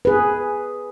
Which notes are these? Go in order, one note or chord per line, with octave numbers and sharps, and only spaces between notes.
G#4 B4